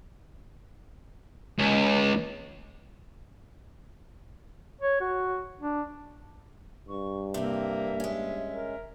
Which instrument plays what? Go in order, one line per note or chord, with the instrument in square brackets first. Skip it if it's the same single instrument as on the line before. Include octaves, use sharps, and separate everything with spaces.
[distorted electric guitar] C#2
[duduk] C#5
F#4
D4
[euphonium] G2 [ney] C#6
[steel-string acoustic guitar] C3 C4 [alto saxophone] A#3 [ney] E5
[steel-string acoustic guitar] G#3 C#4
[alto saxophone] A#4